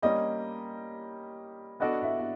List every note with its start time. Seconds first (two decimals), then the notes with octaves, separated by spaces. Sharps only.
0.02 G3 A#3 C#4 D#5
1.80 B3 D4 F#4 A4 D5 D#5
2.02 E5
2.17 E5